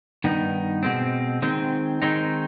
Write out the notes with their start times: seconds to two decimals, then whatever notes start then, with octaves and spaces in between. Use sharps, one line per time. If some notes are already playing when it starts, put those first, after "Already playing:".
0.24 G2 D#3 B3 D#4
0.83 B2 G#3 C4
1.42 D#3 G#3 C4
2.02 D#3 G#3 C4 D#4